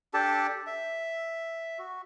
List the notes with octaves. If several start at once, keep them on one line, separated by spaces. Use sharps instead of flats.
D4 G4 A4 A5
E5
F#4